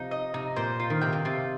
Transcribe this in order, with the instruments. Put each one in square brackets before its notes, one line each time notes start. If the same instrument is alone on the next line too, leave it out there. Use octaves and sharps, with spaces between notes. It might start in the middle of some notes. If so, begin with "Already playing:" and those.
Already playing: [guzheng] C3 F3 [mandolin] D#4
[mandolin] D#5
[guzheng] C3 [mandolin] D#4
[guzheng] A#2 [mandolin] C5
[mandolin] F4
[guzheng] D#3
[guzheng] C3 [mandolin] G5
[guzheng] C3
[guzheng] C3 [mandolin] F4